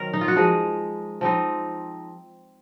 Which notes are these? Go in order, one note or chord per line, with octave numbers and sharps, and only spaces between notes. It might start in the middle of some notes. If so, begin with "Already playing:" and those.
Already playing: D#3 F#3 C4 A#4
D#4
F4
F#4
F3 G#3 D#4 G#4
F3 C4 D#4